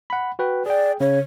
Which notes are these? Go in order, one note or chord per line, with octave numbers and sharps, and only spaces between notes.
F#5 B5
F#4 B4 G5
G#4 D5 G5
C#3 C#5